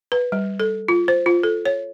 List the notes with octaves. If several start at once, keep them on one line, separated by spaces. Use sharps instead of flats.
B4
G3
A4
F4
C5
F4
A4
C#5